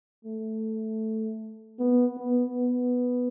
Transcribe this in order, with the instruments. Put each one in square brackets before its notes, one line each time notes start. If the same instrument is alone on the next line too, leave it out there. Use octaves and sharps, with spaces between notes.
[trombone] A3
B3
B3
B3